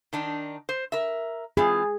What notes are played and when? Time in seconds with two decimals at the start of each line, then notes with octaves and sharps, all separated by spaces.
0.13 D#3 D4 D#4
0.69 C5
0.92 A#4 E5
1.57 E3 C4 F4 G#4